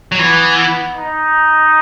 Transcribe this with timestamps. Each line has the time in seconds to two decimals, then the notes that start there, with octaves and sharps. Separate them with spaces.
0.12 F#3
0.19 E3 B3
0.96 D#4